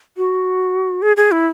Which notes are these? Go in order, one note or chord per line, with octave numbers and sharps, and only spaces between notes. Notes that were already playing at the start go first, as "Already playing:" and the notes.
F#4
G#4
G#4
E4